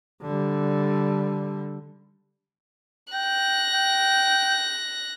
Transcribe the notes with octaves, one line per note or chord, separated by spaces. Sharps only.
D3 G3
G5 F#6 A#6
G5